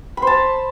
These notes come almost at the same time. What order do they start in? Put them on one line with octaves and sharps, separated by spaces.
B5 C5 A5